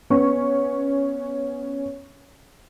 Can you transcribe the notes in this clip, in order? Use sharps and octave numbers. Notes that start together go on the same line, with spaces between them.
B3 C#4 C#6